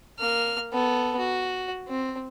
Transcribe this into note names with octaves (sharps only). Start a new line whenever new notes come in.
A#3 F6
B3 A4
F#4
C4